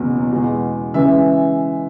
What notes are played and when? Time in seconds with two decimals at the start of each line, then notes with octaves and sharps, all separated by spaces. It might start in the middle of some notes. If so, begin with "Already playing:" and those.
Already playing: F#1 E2 B2 F#3
0.31 E2 B2 G#3
0.94 C#3 E3 G#3 E5